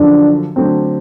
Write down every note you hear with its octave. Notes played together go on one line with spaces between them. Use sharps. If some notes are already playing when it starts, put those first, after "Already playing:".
Already playing: F#2 D3 F3 D4
D3 F#3 A3 C4